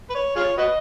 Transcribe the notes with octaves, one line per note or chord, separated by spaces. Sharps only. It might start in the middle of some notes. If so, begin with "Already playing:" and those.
B4
C#5
F4 G#4 C#5
F#4 B4 D#5